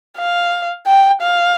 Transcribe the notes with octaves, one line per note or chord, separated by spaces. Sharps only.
F5
G5
F5